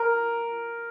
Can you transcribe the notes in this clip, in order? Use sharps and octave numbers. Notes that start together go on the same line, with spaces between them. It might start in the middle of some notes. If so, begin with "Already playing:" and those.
Already playing: A#4